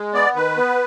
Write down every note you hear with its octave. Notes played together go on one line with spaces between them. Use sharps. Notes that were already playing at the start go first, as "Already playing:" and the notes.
Already playing: G#3
B3 D5
D#3 B4
B3